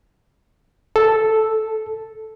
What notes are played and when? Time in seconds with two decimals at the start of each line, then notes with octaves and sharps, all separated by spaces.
0.96 A4